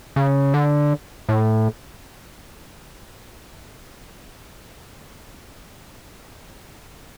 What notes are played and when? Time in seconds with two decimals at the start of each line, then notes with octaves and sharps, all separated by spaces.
0.16 C#3
0.54 D3
1.29 A2